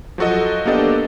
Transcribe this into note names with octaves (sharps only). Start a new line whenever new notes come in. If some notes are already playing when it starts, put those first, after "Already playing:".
F3 F#3 F#4 A4 D#5
A#3 B3 D4 G4 A4 D#5